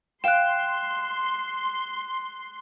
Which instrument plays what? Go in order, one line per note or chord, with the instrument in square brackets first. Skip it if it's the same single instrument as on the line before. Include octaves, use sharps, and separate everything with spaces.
[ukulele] F5 G5 [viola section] C6 [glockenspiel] F#6 E7